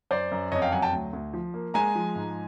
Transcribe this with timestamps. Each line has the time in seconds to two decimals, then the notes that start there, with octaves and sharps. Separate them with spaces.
0.11 F#2 C5 D5
0.32 F#2
0.52 F2 C#5 D#5
0.62 F5 G5
0.72 F#3 F#5 G#5
0.82 G5 A5
0.93 D2
1.13 D2
1.33 F3
1.54 A#3
1.74 G#3 G#5 A#5
1.95 F3
2.16 G#2